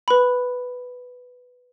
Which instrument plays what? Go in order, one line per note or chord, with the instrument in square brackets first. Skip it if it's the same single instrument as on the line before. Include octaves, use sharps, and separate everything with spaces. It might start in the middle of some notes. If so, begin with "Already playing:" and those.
[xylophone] B4 B5